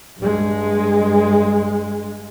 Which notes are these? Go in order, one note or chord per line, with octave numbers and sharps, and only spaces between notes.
G2 G#3